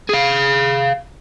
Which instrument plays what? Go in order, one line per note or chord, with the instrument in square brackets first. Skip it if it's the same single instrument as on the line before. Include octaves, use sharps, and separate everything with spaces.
[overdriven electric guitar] G#4 F5